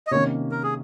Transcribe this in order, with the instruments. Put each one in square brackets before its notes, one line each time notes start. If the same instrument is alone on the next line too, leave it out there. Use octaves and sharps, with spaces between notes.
[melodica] D#5
[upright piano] C3 D#3 A#3 C#4 [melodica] C#5
[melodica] A#4
G#4